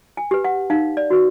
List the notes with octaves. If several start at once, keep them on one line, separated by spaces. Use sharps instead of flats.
G#5
G4 B4
F#5
D#4 F5
D5
F#4 B4